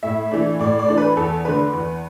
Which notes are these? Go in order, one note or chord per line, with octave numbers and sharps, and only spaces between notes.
A2 E5
E3 A3 D4
A2 D5
D5
E3 A3 D4
B4
E2 A4
D3 A3 D4 B4
E2